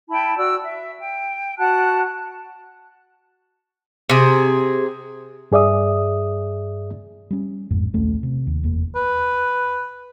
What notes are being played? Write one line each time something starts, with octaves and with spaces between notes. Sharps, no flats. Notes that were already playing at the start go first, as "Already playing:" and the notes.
E4 G5 A5 B5
F#4 D5 E6
E5
G5
F#4 F#5 A5 F#6
C3 G#4
G2 G#4 D5 E5 D#6
G3 C#4
A1 F2 G#2
A#1 D#2 A3 C#4
C3
D#2
F#1 E2 E3 A#3
B4